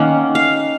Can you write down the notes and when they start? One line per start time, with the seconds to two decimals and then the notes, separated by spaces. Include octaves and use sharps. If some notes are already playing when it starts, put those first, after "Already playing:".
Already playing: D#3 A#3 C#4 F#5
0.35 F5